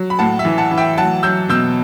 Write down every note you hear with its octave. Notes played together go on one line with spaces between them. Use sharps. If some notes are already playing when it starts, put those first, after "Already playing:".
Already playing: F#3
B5
A2 F#5 A5
E5
E3
F#5 A5
E3
E5 G5
F#3 F#5 A5
F#3 E6 G6
B2 E6 G6